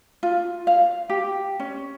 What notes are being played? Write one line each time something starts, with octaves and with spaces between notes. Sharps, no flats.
F4
F5
G4
C#4